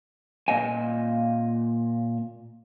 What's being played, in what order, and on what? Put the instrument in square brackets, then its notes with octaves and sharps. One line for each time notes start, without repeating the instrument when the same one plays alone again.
[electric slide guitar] A#2 D#5 F5 G#5